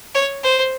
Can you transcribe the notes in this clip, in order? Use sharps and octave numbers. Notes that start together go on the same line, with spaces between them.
C#5
C5